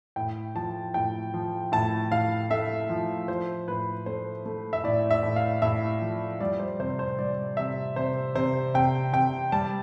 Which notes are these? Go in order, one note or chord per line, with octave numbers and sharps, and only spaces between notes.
A2 G5
F3 A5
A2 G5
F3
A2 A5
A2 F5
A3 E5
F3
F3 C5
A2 B4
A3 C5
A3
E5
A2 D5
E5
A2
F5
A2 E5
F3
G3 D5
C5
C3 C5
C5
G3 D5
C3 E5
C3 C5
C3 C5
C3 G5
C3 G5
G3 A5